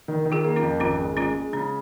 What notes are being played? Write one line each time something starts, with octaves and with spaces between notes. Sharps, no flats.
D#3
D#3
F4 G#4
A#3
C#4 F4
F2
G#1 C#4 F4
G#3
G#3 C#4 F4
G#3
C#3 C#4